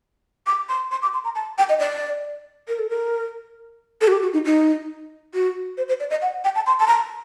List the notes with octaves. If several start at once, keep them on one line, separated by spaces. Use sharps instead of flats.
D6
C6
C6
D6
C6
A#5
A5
G5
D#5
D5
A#4
A4
A#4
A4
F#4
G4
F#4
D#4
D#4
F#4
C5
C5
D5
D#5
F#5
G5
A5
C6
A5
A#5